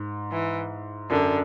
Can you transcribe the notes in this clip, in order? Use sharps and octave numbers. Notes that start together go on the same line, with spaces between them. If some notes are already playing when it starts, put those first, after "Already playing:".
Already playing: G#2
E3
F#2 D3